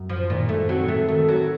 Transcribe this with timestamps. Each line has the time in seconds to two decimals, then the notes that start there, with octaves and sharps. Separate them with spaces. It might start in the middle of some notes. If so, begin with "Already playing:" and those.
Already playing: F#2
0.09 F3
0.30 A#2 D#3
0.49 A3
0.69 F#3 C4
0.88 A3
1.08 D#3 A3
1.29 F#3